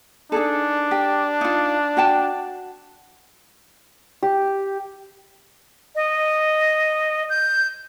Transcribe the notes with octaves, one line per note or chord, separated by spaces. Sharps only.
D4 D#4 G#4 A4
G4
D#4 F4
F#4 G5 A5
G4
D#5
G6